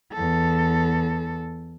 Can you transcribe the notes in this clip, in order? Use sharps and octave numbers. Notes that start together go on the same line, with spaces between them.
E2 A4